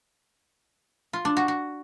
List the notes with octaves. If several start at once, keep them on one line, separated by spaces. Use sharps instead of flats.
F4
D4
F#4
F#4